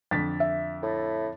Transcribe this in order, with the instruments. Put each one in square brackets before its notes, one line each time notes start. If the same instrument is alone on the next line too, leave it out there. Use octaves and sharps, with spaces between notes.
[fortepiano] F2 D3 [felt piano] A6 B6
[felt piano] E5
[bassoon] A2